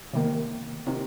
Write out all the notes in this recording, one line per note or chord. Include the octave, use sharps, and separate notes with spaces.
C3 D#3 A#3
C3 D#3